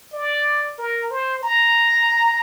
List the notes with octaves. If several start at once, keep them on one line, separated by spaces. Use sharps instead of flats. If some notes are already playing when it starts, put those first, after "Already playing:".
D5
A#4
C5
A#5